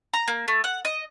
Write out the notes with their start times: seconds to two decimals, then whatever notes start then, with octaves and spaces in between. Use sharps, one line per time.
0.13 A#5
0.28 A#3
0.48 A3
0.64 F#5
0.85 D#5